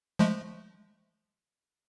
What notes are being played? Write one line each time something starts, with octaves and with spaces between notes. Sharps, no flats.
F3 G#3 A3